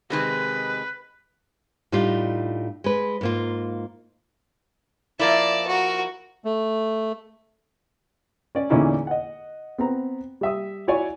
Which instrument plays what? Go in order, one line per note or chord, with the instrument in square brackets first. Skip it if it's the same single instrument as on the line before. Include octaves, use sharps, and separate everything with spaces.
[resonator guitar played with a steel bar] C3 D#3 G#3 [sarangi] B4
[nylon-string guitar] A2 G3 D4 D#4 F4
G#3 B4
G#2 A#3 F4
[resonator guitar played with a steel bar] F3 A#3 E4 [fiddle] D5 A5
[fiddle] F#4 A#4
[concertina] A3
[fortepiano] C#4 D5
E2 A#2 D3 C#4 D#4 E4
D#5 F#5
B3 C4 A#5
G3 E5 D#6
E4 F#4 C#5 D5 G#5 C#6